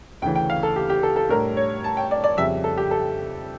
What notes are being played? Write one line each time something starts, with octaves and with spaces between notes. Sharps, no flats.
D2 C#3 E3 G5
G5
F5
A4
G4
G4
A4
A4
A2 G3 D4 A#4
C#5
A5
G5
D5
D5
F2 C#3 G3 E5
A4
G4
A4